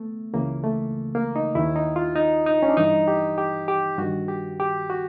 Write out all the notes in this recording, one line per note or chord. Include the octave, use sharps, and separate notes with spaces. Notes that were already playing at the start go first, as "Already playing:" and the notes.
Already playing: A3 B3
C#2 C#3 E3 A#3
A3
A#3
D#4
D#2 D#3 E4
D#4
F4
D#4
D#4
C#4
D4
G2 E3 D#4
G4
G4
G4
G2 D#3 F#4
G4
G4
F#4